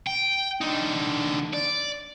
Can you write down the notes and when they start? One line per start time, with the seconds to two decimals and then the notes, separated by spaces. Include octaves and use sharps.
0.07 G5
0.61 D3 D#4
1.54 D5